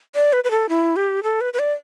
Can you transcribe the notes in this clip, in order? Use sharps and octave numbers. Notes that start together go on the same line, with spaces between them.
D5
B4
B4
A4
E4
G4
A4
B4
B4
D5